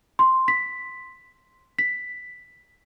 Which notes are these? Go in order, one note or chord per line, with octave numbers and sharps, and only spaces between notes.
C6
B6
B6